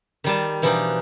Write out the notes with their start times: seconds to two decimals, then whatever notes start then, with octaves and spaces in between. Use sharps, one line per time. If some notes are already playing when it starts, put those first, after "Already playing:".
0.24 D#3 G3 A5
0.62 B2 E3 F3 D4 D#4